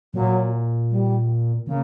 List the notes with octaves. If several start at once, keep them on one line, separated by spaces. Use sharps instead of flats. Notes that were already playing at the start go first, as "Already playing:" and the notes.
A#2 F#3
G3
C#3 A#3